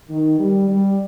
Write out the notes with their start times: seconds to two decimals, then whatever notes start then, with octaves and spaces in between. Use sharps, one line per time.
0.09 D#3
0.38 G3
0.68 G3